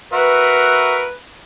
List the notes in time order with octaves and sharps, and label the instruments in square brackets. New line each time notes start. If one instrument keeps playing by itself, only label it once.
[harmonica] F#4 A#4 E5 [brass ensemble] B4